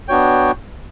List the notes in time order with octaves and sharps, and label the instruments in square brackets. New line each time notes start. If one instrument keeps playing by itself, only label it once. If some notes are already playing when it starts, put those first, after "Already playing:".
[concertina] B3 D4 F#4 C#5 G5